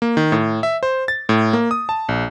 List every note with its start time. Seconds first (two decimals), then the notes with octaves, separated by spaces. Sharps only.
0.02 A#3
0.17 D#3
0.32 A2
0.63 E5
0.83 C5
1.08 A6
1.29 A2
1.53 A#3
1.71 D#6
1.89 A5
2.09 A#1